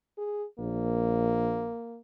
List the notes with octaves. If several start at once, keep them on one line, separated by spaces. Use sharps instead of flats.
G#4
A#1 A#3